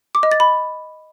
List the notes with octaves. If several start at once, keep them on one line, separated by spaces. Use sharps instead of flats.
D6
D#5
A6
B5